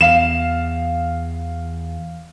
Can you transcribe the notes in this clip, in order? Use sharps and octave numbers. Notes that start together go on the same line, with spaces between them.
E2 F5 E7